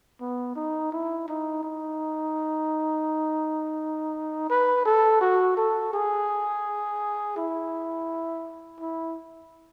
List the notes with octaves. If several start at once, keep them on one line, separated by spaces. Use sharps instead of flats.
B3
D#4
E4
D#4
D#4
B4
A4
F#4
A4
G#4
E4
E4